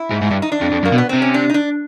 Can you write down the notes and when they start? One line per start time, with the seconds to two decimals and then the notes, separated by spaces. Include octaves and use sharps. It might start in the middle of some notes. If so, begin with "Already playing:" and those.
Already playing: E4
0.11 G#2
0.22 G#2
0.31 G2
0.42 D#4
0.52 D4
0.61 F2
0.72 F2
0.83 F#2 A#3
0.92 B2
0.98 B3
1.09 C3 C4
1.22 C#4
1.34 D4
1.50 D#4
1.54 D4